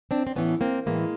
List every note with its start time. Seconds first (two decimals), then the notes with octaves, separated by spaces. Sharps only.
0.11 C4 D4
0.27 C4
0.36 A2 E3 B3 C#4
0.61 A#3 C4
0.86 A2 E3 G#3 A#3